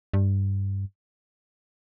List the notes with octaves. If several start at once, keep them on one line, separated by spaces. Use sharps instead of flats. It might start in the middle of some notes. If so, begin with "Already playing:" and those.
G2